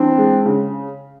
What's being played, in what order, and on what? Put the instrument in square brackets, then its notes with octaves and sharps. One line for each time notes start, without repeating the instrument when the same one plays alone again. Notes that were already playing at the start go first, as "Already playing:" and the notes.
Already playing: [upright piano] E3 [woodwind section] C4 D4
[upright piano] G#3
C#3